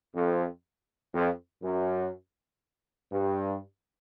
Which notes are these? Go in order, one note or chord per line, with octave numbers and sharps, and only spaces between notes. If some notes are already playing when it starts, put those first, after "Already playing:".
F2
F2
F#2
G2